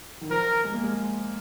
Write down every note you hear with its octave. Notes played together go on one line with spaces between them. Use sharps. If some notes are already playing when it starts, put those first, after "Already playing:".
D#3
F3 A#4
G#3
A#3
G#3